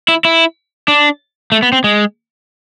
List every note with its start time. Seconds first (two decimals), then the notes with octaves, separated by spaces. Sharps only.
0.08 E4
0.25 E4
0.88 D4
1.52 A3
1.63 B3
1.72 C4
1.84 G#3